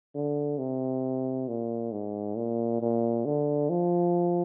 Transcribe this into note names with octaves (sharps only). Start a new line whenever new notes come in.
D3
C3
A#2
G#2
A#2
A#2
D3
F3